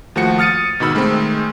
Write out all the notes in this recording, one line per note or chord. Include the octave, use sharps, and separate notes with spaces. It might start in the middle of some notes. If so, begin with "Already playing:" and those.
D#2 F3 A3 F#4 C#7
D#6 F6 A6 C#7 D#7
G#2 B2 D#3 B5 E6
D#3 G#3 A3 C4